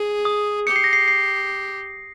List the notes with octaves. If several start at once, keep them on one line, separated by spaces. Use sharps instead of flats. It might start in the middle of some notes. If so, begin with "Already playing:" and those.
Already playing: G#4
D#6
G4 C#7
C7
A#6
C7
C7